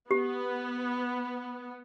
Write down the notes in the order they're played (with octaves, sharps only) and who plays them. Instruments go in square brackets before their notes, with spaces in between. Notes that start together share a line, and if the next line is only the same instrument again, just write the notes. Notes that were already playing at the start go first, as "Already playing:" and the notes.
[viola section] B3 [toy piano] G4